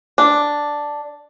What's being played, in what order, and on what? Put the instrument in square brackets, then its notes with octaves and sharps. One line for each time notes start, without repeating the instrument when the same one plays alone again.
[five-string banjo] D4